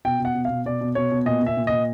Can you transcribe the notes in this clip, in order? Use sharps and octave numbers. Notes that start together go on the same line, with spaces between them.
B2 G5
B2
F#5
B2
F5
B2
B2 D5
B2
B2 C#5
B2
A#2 D#5
A#2 E5
A#2
A#2 D#5